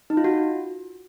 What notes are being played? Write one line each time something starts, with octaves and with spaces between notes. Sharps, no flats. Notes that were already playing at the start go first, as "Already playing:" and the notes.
D#4
F4
F#4